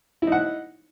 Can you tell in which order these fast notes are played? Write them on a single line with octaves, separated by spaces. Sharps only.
E4 D#4 F#5